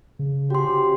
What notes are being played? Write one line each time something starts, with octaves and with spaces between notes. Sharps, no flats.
C#3
F3 C#4 F#4 G4 C6